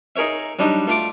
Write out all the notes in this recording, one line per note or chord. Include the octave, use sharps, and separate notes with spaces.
D#4 G#4 A#4 C#5 E5
F#3 G3 D4 D#4
A3 F4 D6